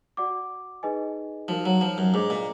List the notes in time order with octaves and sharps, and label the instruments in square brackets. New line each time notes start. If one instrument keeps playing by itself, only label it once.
[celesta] F#4 D5 F#5 D6
D#4 G#4 B4 D#5 G#5
[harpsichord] F3 [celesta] D#4 F#4 A#4 F5
[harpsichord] F#3
F3
F#2
[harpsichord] G#2 [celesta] D4 G#4 D#5 A#5 D6
[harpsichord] A#2